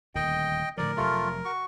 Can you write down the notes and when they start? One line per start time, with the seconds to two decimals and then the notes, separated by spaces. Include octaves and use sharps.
0.15 D#1 D2 D#3 D#5 G5
0.77 A2 D3 F3 A#4 D5
0.97 F1 C3 F#3 A3 F4
1.45 F#4 C#6